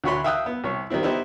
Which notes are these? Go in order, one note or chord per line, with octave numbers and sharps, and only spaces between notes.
D2 E4 F#4 C#5 B5 C6
E5 F5 G5 D#6 E6 F#6
B3
C2 C#5
D#3 G3 C4 E4
B3 D#4 E4 G4 C5